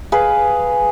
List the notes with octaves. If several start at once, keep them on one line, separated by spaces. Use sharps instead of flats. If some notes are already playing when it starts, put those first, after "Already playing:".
G#4 B4 F5